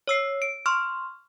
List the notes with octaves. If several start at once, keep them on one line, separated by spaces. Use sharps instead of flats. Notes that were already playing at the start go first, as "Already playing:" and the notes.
C#5 E6 C7
D7
C6 C#6 F6